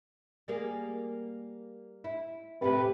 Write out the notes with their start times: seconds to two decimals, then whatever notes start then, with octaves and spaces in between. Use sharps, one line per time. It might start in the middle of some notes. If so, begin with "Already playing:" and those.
0.48 G3 A#3 G#4
2.04 E4
2.62 E2 A2 C3 G4 A4 B4